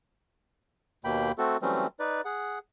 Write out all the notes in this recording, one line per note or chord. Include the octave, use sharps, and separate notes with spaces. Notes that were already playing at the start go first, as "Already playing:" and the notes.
D#2 B2 A#3 G5 B5
A3 C4 F#4 A4
E3 F#3 G3 A3 C4 C#4
D#4 B4 D5
G#4 F#5